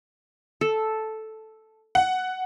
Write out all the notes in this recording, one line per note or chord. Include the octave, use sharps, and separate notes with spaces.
A4
F#5